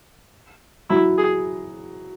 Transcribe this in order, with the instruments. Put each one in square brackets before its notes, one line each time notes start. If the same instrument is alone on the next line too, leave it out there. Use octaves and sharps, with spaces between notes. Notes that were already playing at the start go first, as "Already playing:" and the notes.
[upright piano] F#3 [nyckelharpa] E4
[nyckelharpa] G#4